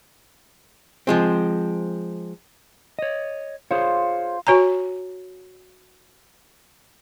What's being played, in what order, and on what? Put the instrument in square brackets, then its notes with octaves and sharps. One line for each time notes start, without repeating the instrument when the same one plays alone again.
[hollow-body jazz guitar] F3 G#3 C4
[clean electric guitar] C#5 D#5
[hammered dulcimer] F4 [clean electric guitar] G#4 C5 C#5
[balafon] F#4 C#5 G#5 A#5